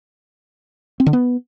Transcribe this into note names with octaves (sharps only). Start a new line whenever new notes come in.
C4
D3
B3